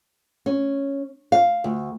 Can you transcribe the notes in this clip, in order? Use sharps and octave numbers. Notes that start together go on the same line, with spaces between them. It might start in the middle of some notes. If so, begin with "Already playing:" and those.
C#4
F5
D2